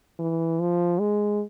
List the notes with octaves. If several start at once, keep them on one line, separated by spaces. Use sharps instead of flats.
E3
F3
G#3